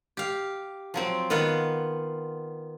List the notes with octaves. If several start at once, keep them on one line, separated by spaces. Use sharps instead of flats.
G4 F5
F3 F#3 C4
D#3 B3 F4 F5 F#5